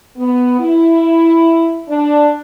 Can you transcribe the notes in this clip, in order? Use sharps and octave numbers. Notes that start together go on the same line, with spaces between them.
B3
E4
D4